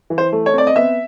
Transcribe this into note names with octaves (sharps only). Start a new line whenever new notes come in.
E3
C5
A3
C#5
C4 D5
D#5
B3 E5